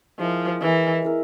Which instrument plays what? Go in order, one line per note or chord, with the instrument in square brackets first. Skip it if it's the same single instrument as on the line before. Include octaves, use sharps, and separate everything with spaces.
[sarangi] F3 [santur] G#3 E4 A#4
[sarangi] E3 [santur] G#3 E4 A#4
[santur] G#3 E4 A#4